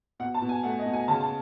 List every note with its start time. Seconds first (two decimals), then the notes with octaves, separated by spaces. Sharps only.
0.19 B2 F#5
0.34 A5
0.42 B2
0.49 G#5
0.63 A3 F#5
0.79 D#5
0.86 B2
0.93 G#5
1.08 C#3 A5
1.21 A5